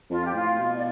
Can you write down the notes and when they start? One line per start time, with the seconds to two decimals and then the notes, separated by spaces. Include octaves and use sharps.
0.10 F2 F4
0.26 G4
0.34 A2 F4
0.59 B2
0.76 D5